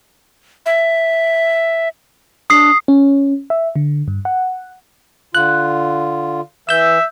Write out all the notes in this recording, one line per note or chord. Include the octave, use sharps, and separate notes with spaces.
E5
D4 D#6 C7
C#4
E5
D3
G2
F#5
D3 F4 F#6
E3 E5 E6 G6